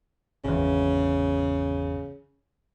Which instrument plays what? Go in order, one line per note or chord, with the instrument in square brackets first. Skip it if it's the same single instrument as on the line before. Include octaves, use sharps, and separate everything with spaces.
[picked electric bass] G#1 E2 [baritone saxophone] C#3